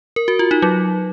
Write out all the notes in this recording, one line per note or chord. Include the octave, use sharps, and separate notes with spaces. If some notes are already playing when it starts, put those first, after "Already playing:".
A#4
F#4
F4
D#4
F#3